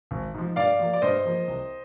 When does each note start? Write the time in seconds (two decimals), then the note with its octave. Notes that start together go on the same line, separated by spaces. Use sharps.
0.11 G#1
0.34 G#2 F3
0.56 G2 D5 F5
0.79 F3 A#3
0.93 D5
1.02 G2 C5 D#5
1.25 F3 A#3
1.47 C2